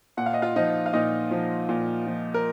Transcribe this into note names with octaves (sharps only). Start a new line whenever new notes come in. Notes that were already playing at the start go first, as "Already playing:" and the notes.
A#2 F#5
F5
D#5
F4 F5
F3 D#4 D#5
F5
A#2 D#4 D#5
F3
A#2
F3
A#4